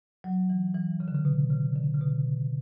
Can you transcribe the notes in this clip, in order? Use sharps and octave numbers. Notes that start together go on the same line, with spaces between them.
F#3
E3
E3
C#3
D3
C#3
B2
C#3
D3
C#3
B2